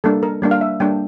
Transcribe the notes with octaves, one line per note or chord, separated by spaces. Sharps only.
G3 A#3 D4 A4
A#4
G3 A#3 D4
F5
E5
G3 A#3 D4 G5